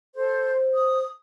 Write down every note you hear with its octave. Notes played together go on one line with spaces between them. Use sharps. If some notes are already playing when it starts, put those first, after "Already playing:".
A4 C5
C5
D#6